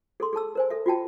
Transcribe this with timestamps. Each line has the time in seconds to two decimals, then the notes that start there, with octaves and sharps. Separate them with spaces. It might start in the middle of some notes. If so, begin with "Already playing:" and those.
0.20 G#4 A4 C6
0.33 G#4 A4 A5 E6
0.55 A#4 C5 G#5
0.70 A4 E5
0.86 F4 F#4 G5 A5